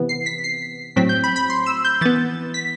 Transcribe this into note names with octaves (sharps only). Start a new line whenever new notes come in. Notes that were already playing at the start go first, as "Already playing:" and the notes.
Already playing: C3 E3 B3
C7
B6
C7
A2 F#3 C4 B6
G6
B5
B5
C6
E6
G6
E3 B3 A6
B6